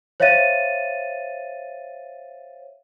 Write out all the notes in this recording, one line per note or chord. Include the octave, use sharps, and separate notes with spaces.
C5 C#5 E5 F5 A6 D#7